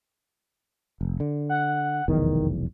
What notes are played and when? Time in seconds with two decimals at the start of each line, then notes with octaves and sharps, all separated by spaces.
1.01 F1
1.20 D3
1.49 F#5
2.08 F1 B1 E2 D#3